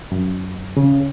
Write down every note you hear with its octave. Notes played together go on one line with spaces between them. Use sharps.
F#2
C#3